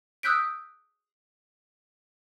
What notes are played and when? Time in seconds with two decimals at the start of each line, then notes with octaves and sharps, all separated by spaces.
0.23 D#6 E6 F#6 G6 B6 D7